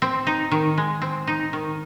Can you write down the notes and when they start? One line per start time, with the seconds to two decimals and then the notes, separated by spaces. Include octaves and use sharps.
0.02 C4
0.27 D#4
0.52 D#3
0.77 G#3
1.02 C4
1.27 D#4
1.53 D#3